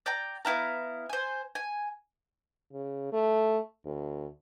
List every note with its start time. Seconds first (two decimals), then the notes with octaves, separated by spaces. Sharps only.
0.06 D5 G5 A#5
0.45 B3 E4 F5 A#5
1.09 C5 G#5
1.55 G#5
2.73 C#3
3.12 A3
3.86 D2